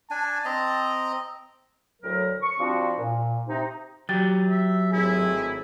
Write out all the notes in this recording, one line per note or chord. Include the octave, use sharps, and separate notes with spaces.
D4 G#5 A5
C4 D#5 A#5
D2 A2 F#3 A#4
C#6
F3 G3 C4 D4 F#4
A#2
C3 D#4
F#3 G4 A6
E5
G#1 A2 E4 G#4